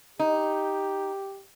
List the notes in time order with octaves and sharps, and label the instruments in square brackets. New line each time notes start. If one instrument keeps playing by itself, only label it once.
[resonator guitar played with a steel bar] D#4 [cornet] G4